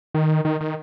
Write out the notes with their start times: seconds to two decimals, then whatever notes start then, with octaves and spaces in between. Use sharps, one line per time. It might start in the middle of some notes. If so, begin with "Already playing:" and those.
0.14 D#3
0.45 D#3
0.61 D#3